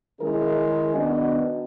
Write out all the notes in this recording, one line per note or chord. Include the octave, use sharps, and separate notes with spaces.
D#3 G#3 C#4 E4 G#4 A#4
D#3 B3 D4 F#4 D#5